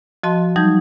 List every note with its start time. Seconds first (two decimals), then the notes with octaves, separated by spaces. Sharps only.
0.23 F3 F#4 D#5 A5 C6
0.56 F#3 G3 D#4 A5 G6 G#6